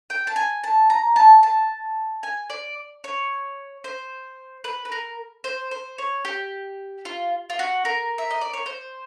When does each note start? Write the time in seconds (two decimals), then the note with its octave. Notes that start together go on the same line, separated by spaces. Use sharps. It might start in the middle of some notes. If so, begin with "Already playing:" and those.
0.10 G5
0.27 A5
0.36 G#5
0.64 A5
0.90 A#5
1.16 A5
1.43 A5
2.23 G#5
2.50 D5
3.04 C#5
3.84 C5
4.64 B4
4.85 B4
4.92 A#4
5.44 C5
5.71 C5
5.98 C#5
6.25 G4
7.05 F4
7.50 F4
7.59 F#4
7.85 A#4
8.18 E5
8.30 D#5
8.41 D5
8.53 C#5
8.66 C5